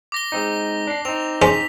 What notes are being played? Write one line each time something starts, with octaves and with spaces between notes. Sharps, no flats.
D6 A#6 G7
G#3 C4 D#4
D4 C7
C4 D#4 F7
G#3 C#4 C5 B6